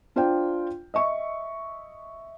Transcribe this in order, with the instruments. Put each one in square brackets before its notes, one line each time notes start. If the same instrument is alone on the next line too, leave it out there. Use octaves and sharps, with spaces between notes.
[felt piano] D4 F4 C5 D5 G5
D#5 E5 C#6